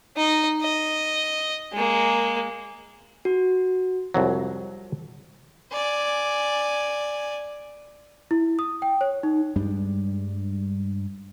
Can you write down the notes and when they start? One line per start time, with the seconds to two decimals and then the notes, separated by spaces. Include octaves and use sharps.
0.17 D#4 D#5
0.62 D#5
1.73 G#3 A#3
3.25 F#4
4.14 C2 F2 F#3
5.72 D5 G#5
8.31 E4
8.59 D#6
8.82 G5
9.01 C#5
9.23 D#4
9.56 G2 G3 G#3 D4